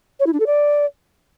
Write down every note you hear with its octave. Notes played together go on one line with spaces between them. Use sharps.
C#5
E4
D4
A4
D5